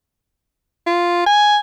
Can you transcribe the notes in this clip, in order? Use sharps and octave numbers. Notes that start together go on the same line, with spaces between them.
F4
G#5